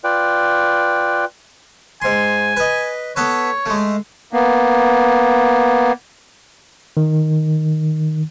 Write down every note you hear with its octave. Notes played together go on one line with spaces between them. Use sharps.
F4 B4 D5 G5
G#2 G#5 C6
B4 D#5
B3 A4 B4 C#5
G#3 A3
A#3 B3
D#3